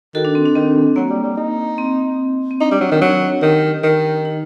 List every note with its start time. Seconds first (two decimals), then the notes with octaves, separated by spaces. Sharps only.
0.15 D#3 F#4 A4
0.25 D4
0.35 C4
0.46 D4
0.55 D#3 C4
0.96 F#3 A#3
1.10 G3
1.24 G3
1.37 D#4
1.78 C4
2.51 C4
2.60 D4 D#4
2.71 G3
2.81 F#3
2.92 D#3
3.02 F#3
3.42 D#3 D#4 G4
3.83 D#3
4.25 D#4